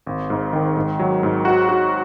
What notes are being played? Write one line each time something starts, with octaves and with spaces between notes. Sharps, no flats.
G#1
G#2
D#3
G#2
F#3
G#2
F#4
F#4